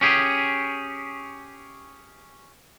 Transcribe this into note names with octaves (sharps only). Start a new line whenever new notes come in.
C#4 G4 G#4